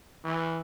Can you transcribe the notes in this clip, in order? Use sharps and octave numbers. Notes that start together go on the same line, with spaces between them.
E3